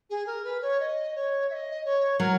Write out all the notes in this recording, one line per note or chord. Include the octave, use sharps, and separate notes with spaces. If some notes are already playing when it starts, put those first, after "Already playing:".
G#4
A#4
B4
C#5
D#5
C#5
E5
D#5
C#5
F#3 A#4